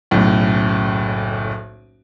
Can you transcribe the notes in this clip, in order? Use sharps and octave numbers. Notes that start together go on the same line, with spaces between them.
F#1 B1 A2